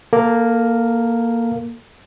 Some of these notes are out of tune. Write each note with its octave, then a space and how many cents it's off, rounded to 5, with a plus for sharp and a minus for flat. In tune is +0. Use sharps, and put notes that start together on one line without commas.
A#3 +0 A4 +20